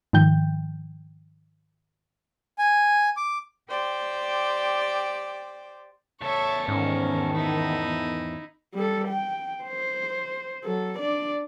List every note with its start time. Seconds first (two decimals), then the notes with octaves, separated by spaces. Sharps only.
0.13 G#2 D#3 F3 G5 G6
2.58 G#5
3.17 D6
3.69 G4 C5 D5 G5
6.21 E2 A4 C#5 E5
6.68 G#2 D#3 B3 C#4 A#4
7.35 D#4 E4
8.74 G3 A4
9.08 G5
9.64 C5
10.64 F#3 A4
10.99 D4 D5